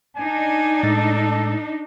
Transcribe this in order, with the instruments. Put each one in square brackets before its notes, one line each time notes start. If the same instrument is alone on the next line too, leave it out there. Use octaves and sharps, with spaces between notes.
[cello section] D4 D#4 [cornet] G#5
[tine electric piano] A2 G#3 A6 [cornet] A4